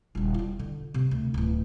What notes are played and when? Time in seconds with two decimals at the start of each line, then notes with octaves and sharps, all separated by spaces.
0.15 D#1 C#3
0.34 E4 F4
0.59 D3
0.94 C3
1.11 D2
1.34 D1 E3